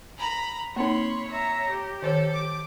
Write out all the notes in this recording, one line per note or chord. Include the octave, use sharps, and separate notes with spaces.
A#5 B5
A#3 C4 D#4 C#5 B5 C6
E5 A#5
G4
D#3 A4 C5 C#5
D6